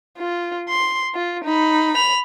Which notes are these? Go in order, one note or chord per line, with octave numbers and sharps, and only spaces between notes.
F4
C6
F4
D#4 B5
B5 F7